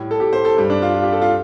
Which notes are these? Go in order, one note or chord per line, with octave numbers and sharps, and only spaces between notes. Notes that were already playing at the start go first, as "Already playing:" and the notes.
Already playing: A2 G3
A4
G4
C5
A4
G2 G3
D4
F4
F4
G4
A4
F4